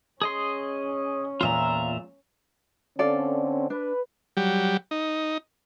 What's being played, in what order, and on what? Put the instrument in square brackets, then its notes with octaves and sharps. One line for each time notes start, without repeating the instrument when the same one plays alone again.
[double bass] C#4 [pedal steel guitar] G#4 D#5 C6
[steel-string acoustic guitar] E2 A#2 [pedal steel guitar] F4 E5 A#5
[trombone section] D3 C4 C#4 [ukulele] A4 D5 F5
[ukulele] D4 [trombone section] B4
[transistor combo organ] F#3 G3 G4
D#4